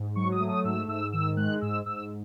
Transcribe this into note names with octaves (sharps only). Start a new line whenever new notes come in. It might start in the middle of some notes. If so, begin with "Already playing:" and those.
Already playing: G#2
F#3 C#6
D#6
A3
D#6
G#2 E6
G#2 E6
D#3 E6
G#3 F#6
G#2 E6
G#2 E6